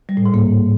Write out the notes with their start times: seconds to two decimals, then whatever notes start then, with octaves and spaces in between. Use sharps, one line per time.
0.09 G3
0.17 A2
0.25 G#2
0.34 A#3